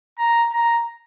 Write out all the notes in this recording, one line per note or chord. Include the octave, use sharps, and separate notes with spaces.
A#5
A#5